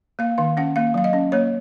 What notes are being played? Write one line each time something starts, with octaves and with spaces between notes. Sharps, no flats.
A#3 F5
D#3 F5
C#4 F#5
A#3 F5
F#3 F5
D#5
C#4
A#3 C#5